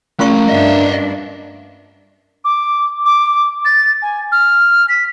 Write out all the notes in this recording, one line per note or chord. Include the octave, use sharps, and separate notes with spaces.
A3 A#3 C#4 F4 G#4 C#6
G2 D4 D#5 E5
D6
D6
A6
G#5
F6
B6